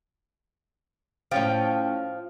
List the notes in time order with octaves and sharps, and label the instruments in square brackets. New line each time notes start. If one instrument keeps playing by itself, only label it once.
[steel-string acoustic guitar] A2 C#4 G5 [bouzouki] F3